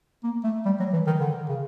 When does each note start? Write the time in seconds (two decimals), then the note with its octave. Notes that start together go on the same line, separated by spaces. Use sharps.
0.24 A#3
0.44 A3
0.65 G3
0.80 F#3
0.93 E3
1.07 D#3
1.21 D3
1.48 C#3